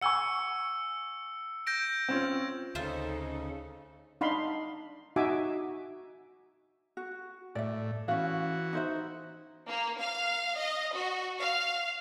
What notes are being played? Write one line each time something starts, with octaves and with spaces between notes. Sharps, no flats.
F#5 G#5 C#6 E6 C#7
G6 A#6 D7
C4 C#4 F4
D2 C#3 C#4 D#4 F4 A4 C5 E5
D4 D#4 F5 B5 C6
D#4 F#4 E5 G#5 D6
F#4
A2 D5 E5
E3 C#4 F#4 F5
D#4 C5 E5
A#3
F5
D#5
F#4
F5